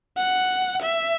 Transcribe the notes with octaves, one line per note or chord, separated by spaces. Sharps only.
F#5
E5